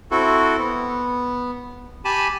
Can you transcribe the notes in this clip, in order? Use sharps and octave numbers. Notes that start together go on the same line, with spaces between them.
C4 E4 F#4 A4
B3
G4 G#5 A5 B5